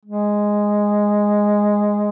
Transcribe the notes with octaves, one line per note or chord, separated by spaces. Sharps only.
G#3